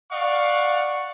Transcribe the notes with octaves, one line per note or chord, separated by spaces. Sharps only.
D5 F5 F#5 C#6